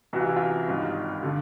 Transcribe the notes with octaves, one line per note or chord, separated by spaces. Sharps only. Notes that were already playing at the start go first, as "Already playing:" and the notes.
C2 C3 E3 F#4
F4
E4
F4
G#1 G2 D#3
D3